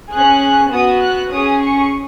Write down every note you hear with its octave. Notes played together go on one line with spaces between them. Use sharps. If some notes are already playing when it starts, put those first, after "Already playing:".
C#4 G#4 F#6
B3 F#4 D#6
F#6
C#4 G#4 D#6
C#6